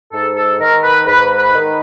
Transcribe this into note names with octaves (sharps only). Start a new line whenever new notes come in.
G#2 A4
A4
D#3 A#4
B4
G#2 B4
B4
D#3